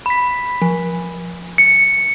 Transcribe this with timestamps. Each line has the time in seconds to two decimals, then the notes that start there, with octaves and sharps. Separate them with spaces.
0.06 B5 B6
0.62 F3
1.58 C#7